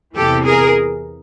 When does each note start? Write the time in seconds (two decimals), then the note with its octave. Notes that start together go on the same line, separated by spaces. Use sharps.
0.16 E2 C3 E3 G4 A4
0.45 G#4 A#4